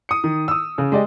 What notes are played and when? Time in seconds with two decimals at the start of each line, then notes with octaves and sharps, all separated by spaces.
0.09 D#6 C#7
0.24 D#3
0.48 D#6 E6
0.78 C#3
0.92 G#3 G4 D5 D#5